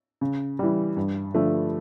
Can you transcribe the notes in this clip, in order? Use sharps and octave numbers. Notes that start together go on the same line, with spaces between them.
C#3
E3 G3
G2
D3 F3 A3